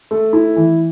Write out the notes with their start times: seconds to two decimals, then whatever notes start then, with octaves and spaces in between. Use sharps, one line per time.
0.11 A3
0.33 E4
0.56 E3